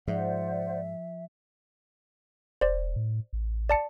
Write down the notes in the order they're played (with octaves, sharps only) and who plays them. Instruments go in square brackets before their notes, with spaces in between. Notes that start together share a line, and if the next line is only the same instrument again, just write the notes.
[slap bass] G#2 [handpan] F3 [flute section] C5 D5 F#5 [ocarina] E5
[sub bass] E1 [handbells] C5 D5
[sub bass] A2
A1
[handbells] D5 A5 C#7